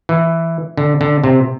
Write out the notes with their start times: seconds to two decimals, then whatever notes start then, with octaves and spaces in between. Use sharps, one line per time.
0.09 E3
0.77 D3
1.01 D3
1.24 C3